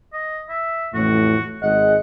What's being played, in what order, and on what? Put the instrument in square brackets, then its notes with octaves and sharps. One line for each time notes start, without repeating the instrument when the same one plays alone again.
[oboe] D#5
E5
[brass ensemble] A1 F2 A2 [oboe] F#4
[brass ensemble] G#1 G#3 D#5 [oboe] F#5